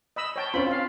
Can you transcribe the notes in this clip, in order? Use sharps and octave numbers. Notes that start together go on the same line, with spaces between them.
D#5 B5 E6
C#5 G5 A5
C4 C#4 F4 B5
F4 F5